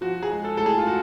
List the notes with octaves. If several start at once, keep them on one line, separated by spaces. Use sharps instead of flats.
F3 F#4
G#4
G#3
A4
A2 A4
G#4
F4
F#4